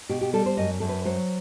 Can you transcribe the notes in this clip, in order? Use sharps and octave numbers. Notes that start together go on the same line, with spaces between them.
B2 G4
G4
G3 A4
C5
F#2 D#5
F#2 A4
B4
F#3 C5